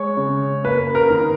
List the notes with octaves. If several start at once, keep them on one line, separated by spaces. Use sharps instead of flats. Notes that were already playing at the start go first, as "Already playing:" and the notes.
Already playing: G#3 C#5
C#3
A#3 B4
A#4
D#3